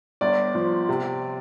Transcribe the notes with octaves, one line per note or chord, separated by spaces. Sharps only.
G1 D5
F3
C3